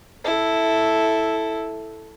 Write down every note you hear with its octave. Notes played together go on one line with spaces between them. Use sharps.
E4 A4